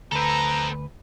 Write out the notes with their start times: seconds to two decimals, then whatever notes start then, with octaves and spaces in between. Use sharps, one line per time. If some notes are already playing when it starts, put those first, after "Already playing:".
0.12 D2 C4 A4 B4 A#5